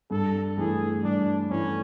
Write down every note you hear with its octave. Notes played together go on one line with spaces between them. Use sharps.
G2 A4
E3 A3 G#4
G2 D4
E3 A3 C#4